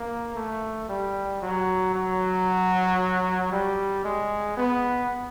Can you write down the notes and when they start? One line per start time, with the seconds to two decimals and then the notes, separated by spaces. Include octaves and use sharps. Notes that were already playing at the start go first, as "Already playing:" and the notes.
Already playing: A#3
0.35 A3
0.89 G3
1.41 F#3
1.94 F#3
3.52 G3
4.04 G#3
4.57 B3